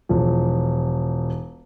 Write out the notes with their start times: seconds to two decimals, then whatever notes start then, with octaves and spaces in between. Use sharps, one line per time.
0.09 E1 F3